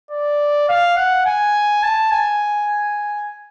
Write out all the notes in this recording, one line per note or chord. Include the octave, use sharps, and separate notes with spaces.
D5
F5
F#5
G#5
A5
G#5